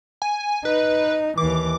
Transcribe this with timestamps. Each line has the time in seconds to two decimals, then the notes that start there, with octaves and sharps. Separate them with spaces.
0.22 G#5
0.65 D#4 B4
1.37 D#2 E3 D6